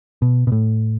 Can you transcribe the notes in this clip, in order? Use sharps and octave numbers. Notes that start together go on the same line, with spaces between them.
B2
B2
A2